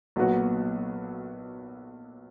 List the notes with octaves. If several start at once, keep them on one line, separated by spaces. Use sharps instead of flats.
B1 A#2 F#3 B3 F#4